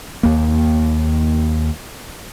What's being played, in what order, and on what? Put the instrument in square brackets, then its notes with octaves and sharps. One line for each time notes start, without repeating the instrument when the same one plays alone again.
[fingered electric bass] D#2 A#3